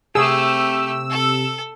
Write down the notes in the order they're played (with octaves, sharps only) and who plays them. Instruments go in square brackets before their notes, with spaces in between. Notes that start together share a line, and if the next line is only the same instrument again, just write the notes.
[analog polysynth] C3 E6 [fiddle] A3 G4 [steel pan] G#4
[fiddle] A4